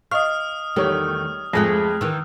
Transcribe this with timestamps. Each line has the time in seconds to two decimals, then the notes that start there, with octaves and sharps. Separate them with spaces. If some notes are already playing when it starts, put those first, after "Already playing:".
0.11 D#5 F5 C#6 D#6 F6
0.76 E2 D#3 G3 A3 C#5
1.53 F2 F3 G#3 A3 G#4 F#6 A#6
2.01 D#3 E3 E6